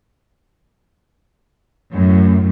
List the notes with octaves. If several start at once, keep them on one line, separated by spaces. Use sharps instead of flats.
F#2 A2